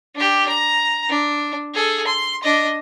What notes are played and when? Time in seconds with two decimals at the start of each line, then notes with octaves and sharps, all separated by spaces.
0.15 D4 G4
0.49 A#5
1.09 D4
1.74 G#4 A4
2.07 C6
2.43 D4 D#5